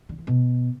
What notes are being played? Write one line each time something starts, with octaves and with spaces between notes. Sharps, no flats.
D3
E3
B2